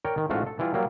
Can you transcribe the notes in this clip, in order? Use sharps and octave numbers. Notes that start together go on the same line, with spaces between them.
A#4 C#5 D5 G5
D#3
A1 G#2 A3 F4 F#4 F5
A4
E3 G3 E4 F4
F#3 G3 A#3